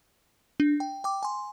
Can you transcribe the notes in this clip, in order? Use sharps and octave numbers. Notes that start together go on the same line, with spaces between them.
D4
G5
G5 D6
G#5 C6